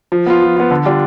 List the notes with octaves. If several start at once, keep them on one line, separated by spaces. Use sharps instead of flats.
F3
B3 F4
F3
B3 F4
D3
G3 D4 F4